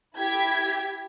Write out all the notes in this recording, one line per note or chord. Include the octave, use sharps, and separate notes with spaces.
E4 G4 G#6 B6